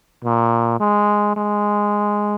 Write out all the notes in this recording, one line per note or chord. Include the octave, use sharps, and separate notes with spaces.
A#2
G#3
G#3